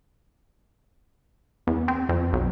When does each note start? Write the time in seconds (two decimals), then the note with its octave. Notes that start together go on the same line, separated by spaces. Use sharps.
1.67 E2
1.88 C4
2.09 F2
2.33 B1